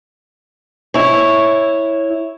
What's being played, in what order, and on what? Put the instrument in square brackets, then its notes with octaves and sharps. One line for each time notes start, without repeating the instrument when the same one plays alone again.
[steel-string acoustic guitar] E4 C#5